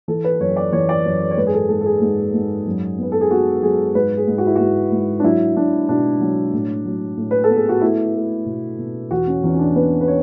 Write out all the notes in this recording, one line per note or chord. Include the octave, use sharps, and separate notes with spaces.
E3 A4
B4
F#2 C#5
D5
E3 C#5
D5
F#2 C#5
C#5
C#5
G#2 B4
G#4
A4
G#2 A4
A4
G#4
G#2
G#2
F#2
B3 B4
A4
G#4
B3 F#4
F#3 G#4
G#2 B4
G#4
G#2
F#4
E4
G#2 F#4
G#2
D4
F#3 E4
F#3 D4
B2 D4
F#3
A2
F#3
A2
B4
A4
B3
G#4
F#4
A3 E4
A3
B2
B2
E2 F#4
C#4
E2 C#4
C#4
D4
B3 B4
B4
C#5